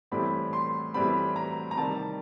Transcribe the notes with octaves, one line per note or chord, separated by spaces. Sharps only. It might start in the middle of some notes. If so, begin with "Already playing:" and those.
A2 E3 G3 C4 B5
C6
A2 E3 G3 C4 B5
A#5
A#5
C3 D#3 G3 A5